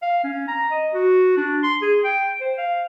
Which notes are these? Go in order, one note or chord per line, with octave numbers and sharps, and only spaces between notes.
F5
C#4
A#5
D#5
F#4
D4
C6
G#4
G5
C5
F5